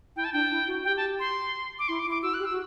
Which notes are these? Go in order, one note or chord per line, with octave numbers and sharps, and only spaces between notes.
E4 G5
A5
D4 G5
E4
F#4
G4 G5
A5
C6
D6
E4 C6
D6
E4
D6
F#4 E6
F#6
G4
E6
F#4